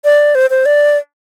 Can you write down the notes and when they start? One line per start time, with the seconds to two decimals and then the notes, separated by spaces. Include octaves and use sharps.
0.05 D5
0.35 C5
0.50 C5
0.66 D5